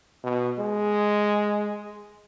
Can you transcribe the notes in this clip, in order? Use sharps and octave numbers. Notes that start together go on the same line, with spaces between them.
B2
G#3